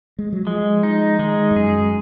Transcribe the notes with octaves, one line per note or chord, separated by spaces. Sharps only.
G#3
F#3
F3 G#3
D#4
D#3 G#3
G#2
F#2 G#4